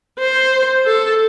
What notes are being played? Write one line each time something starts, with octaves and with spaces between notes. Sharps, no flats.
C5
A4